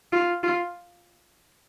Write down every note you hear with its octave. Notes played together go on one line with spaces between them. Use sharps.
F4
F4